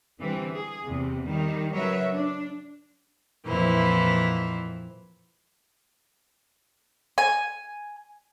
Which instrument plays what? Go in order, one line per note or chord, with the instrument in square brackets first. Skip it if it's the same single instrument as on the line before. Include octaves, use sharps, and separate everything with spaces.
[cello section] D3 E3 G3 C4
G#4
E2 C3
D#3 G3
C#3 F#3 A#4 B4 C#5 E5
D4
[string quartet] F2 A#2 E3 E4 C5
[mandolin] G#5